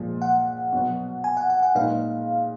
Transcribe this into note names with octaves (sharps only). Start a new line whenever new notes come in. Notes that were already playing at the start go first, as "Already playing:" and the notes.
Already playing: A#2 F3 G#3
F#5
B2 F#3 B3
G#5
F#5
F#5
F#5
A#2 G#3 D#4 G#4 B4 F5